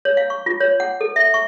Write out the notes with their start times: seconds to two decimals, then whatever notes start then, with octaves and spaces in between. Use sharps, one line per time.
0.05 C#5
0.17 F5
0.30 C#6
0.46 F4
0.60 C#5
0.80 F#5
1.01 A4
1.16 E5
1.34 C#6